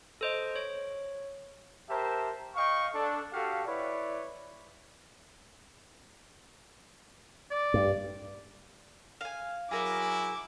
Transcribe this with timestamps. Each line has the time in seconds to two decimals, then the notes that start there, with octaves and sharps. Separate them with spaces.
0.21 A4 C5 D#5
0.56 C#5
1.89 G4 A#4 C5 E5 A5
2.55 D#5 F5 G5 C#6
2.93 D4 A4
3.31 F#4 G4 A4 F5
3.65 E4 B4 C#5 D5
7.51 D5
7.74 G2
9.21 F5 G#5
9.71 F#3 E4 G#4 A#4 D6